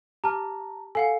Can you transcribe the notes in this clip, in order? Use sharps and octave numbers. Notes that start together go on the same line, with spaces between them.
G4 A5 A#5 F6
A4 F5 F#5 G#5